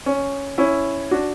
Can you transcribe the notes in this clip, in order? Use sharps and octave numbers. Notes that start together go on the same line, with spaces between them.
C#4
C#4 E4
D4 F#4